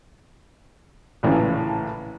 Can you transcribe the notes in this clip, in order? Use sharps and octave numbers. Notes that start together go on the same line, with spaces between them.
A#1 A2 C#3 E3